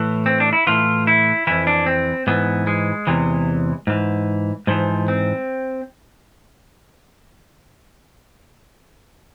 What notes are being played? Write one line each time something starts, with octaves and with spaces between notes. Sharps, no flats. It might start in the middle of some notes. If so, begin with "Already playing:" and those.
Already playing: A2 E3
C4
D4
E4
A2 E3 F4
E4
F2 E3 E4
D4
C4
G#2 E3 B3
G#3
E2 C3 E3
G#2 E3
G#2 E3 F3
C4